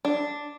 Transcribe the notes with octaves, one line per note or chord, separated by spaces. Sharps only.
D4